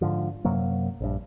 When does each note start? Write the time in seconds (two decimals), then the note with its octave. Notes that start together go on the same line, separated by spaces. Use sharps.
0.01 G#2 D3 F3
0.45 F#2 C3 F#3 A#3
1.01 A#1 G2